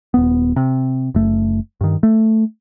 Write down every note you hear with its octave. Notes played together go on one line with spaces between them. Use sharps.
D#1 B3
C3
F#1 A3
G2 D#3
A3